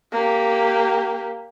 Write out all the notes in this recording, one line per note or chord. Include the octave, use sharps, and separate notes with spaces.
A#3 G4